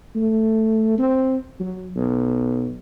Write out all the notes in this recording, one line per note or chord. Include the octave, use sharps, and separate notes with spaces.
A3
C4
F#3
B1